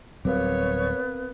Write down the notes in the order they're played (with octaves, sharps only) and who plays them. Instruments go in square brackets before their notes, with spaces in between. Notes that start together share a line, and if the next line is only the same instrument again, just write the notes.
[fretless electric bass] D1 F#3 G3 [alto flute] B3 [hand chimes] C4 A#4 F5 [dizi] C#5